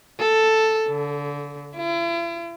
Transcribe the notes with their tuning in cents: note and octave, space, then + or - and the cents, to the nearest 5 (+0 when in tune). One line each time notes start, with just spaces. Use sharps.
A4 +0
D3 -30
E4 +45